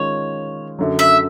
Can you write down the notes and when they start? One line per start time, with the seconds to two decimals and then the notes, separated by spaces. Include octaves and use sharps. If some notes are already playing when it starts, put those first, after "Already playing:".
Already playing: D#3 G#3 C#4 F4 C#5
0.79 F#2 D3 F#3
0.99 E5